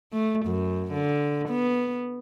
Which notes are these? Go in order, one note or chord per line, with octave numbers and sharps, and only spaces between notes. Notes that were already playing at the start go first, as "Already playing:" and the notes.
A3
F#2
D3
B3